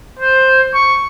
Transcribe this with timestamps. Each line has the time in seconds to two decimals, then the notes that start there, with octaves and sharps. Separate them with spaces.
0.19 C5
0.74 C#6